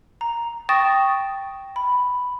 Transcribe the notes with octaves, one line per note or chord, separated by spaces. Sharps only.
A#5
G5 C#6 D#6 A6 A#6 E7
B5